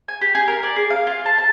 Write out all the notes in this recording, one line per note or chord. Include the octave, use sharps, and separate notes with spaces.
G#5
G4
G#4
A#4
D5
G#4
F5
F4
A5
A5